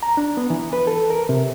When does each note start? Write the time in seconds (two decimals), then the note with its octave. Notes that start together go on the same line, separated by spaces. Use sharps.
0.03 A#5
0.17 D4
0.37 B3
0.50 E3
0.73 B4
0.87 A4
1.10 A#4
1.29 C3